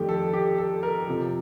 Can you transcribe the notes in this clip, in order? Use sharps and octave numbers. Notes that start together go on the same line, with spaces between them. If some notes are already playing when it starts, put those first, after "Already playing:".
Already playing: F2 D#3 A3 D4 G4
A4
G4
A4
A#4
F2 C3 F3